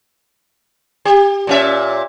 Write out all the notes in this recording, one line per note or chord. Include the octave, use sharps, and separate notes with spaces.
G4
A#2 C#4 E5